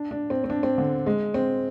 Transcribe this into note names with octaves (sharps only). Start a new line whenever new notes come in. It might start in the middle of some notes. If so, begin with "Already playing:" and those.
Already playing: D4
D4
C4
C4
D4
C4
D3
G#3
C4